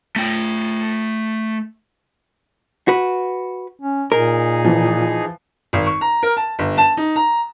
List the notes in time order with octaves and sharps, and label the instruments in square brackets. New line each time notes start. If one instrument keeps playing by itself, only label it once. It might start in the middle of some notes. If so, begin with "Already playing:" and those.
[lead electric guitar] A3 G5
[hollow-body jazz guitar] F#4 B4
[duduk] C#4
[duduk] A#2 [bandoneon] D#4 G#4 [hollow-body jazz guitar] A#4
[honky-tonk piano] E3 F3
[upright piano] G#1
C#6
A#5
A#4
A5
G1
A5
D#4
A#5